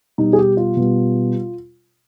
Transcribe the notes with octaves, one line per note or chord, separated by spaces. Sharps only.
B2 G3 D#4
G#4
G4
F4
B2 G3